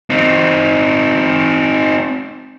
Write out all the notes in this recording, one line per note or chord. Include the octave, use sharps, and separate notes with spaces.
C4 D#4